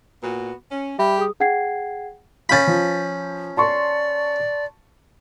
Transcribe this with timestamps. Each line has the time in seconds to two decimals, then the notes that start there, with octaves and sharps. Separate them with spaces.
0.23 A#2 B3 F#4
0.71 C#4
0.99 G3 G4 E5 B5
1.18 G#4 D#6
1.40 G#4 F#5 G5 G#6 C7
2.49 C#4 F5 B5 G6 A6
2.67 F3
3.57 D5 A5 C6 C#6